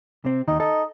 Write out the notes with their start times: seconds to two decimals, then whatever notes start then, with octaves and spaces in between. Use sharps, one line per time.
0.25 C3 C4
0.48 D#2 D#3 D#4
0.60 D#4 A4